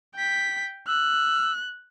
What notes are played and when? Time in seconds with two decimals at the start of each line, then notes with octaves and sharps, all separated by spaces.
0.16 G5 B6
0.88 E6 F#6